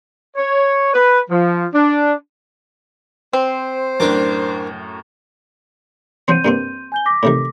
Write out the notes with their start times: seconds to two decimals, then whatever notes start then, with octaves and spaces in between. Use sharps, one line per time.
0.36 C#5
0.94 B4
1.29 F3
1.74 D4
3.33 C4 C5
4.00 F#2 A2 D4 A#4 D6
6.28 F3 F#3 C4 C6 G6 D#7
6.45 G2 A#3 C4
6.92 G#5 G6 G7
7.06 D6 A#6 B6
7.23 A2 C3 D#3